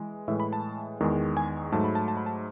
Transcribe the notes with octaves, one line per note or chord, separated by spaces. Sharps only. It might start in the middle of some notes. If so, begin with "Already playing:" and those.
Already playing: E3 G#3
A2 E3 G#3 E5
B5
A5
E2 D#3 G#3
G#5
G#2 F#3 A3 A5
B5
A5
A5
B5
A5